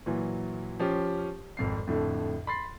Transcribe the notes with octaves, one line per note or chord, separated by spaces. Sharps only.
A#2 E3 F#3
F3 C#4 G4
G#1 F2 C7
F2 A2 D3
B5 C6 A6 C7